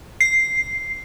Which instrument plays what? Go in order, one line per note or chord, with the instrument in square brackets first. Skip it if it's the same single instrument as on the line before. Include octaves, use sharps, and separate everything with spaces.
[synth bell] C7